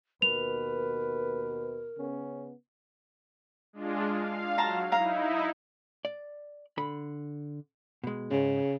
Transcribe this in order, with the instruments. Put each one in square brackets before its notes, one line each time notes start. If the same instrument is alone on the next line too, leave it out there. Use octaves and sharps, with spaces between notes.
[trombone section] D#2 B2 B4 [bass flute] A#4 [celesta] F7
[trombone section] C#3 B3 C#4
[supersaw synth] G#3 D4 F4
F5
[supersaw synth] F#3 [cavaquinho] A5 A#5 C6
[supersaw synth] D#4 E4 [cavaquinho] F5 A#5
[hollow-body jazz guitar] D5
D3 B5
B2 G#3
[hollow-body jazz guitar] G#2 [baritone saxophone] C#3